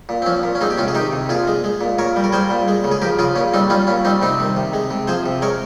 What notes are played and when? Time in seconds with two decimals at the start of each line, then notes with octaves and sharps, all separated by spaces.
0.09 A#2
0.22 C4
0.26 F3 C#4
0.43 A#2
0.55 C#4
0.61 G#3 C4 D#4
0.70 G4
0.78 C3 C#4 F4
0.88 G#4
0.95 D#3 D#4 G4
1.13 C3
1.29 A#2 F4 G#4
1.47 G#3
1.64 G#3
1.81 A#2
1.98 A#2 A#4 C#5
2.16 G3
2.24 A#4
2.32 G3 G#4 C5
2.50 A#2
2.68 G#3
2.84 C#3
2.91 G#4
3.02 F3 G4 A#4
3.19 C#3 F4 G#4
3.35 A#2 C#4
3.54 G3 C4 D#4
3.70 G3 C#4 F4
3.87 A#2 C#4
4.05 G3 C4 D#4
4.22 C3 C4 D#4
4.40 D#3
4.57 C3
4.73 G#3
4.91 C3
5.07 F3 G#4 C5
5.26 C3
5.42 G#3 A#4 C#5